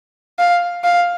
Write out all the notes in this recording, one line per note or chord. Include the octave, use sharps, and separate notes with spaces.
F5
F5